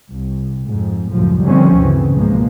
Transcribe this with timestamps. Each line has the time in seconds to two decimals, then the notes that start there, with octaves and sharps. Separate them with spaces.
0.11 C2
0.65 F2 G#2
1.12 C#2 F#2 A2 F3
1.44 D3 D#3 F3 G3 C4 C#4
1.76 G1 D2 C#3 E3
2.13 C#2 G#2 B2 F3 G#3 A#3